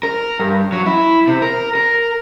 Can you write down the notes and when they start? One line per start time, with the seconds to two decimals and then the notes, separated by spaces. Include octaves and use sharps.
0.03 A#4
0.40 G2
0.72 F#3
0.86 E4
1.28 C3
1.42 A#4
1.75 A#4